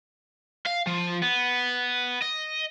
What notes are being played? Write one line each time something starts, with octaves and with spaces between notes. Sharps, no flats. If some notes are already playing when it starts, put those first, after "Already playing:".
F5
F3
B3
D#5